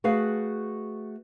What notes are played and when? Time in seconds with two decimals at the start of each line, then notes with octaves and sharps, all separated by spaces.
0.04 A3 F#4 G#4 B4 F5